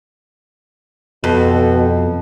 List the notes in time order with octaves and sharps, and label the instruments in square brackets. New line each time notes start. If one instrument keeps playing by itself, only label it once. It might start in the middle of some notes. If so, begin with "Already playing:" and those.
[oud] F2 [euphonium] B2